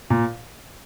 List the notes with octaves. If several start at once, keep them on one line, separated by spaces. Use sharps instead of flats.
A#2